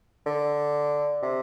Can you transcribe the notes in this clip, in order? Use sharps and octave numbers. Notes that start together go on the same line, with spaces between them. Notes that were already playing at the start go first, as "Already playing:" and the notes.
D3
C3